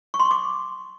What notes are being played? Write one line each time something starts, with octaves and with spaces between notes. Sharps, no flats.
C#6
C6
C#6
D6